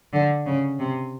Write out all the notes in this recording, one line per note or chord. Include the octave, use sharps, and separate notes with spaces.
D3
C#3
C3